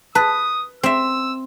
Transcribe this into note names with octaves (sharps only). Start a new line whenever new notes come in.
B4 A5 D#6
C4 E5 E6